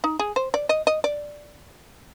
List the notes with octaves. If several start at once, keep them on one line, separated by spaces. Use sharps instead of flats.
D#4
G#4
C5
D5
D#5
D#5
D5